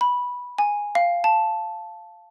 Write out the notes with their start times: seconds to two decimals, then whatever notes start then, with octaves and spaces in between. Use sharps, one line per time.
0.01 B5
0.58 G#5
0.95 F5
1.24 A5